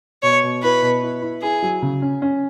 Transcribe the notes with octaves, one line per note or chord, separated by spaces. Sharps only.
B2 C#5
B2
E4 B4
B2
E4
E4
E4 G#4
F#3
C#3
C#4
C#4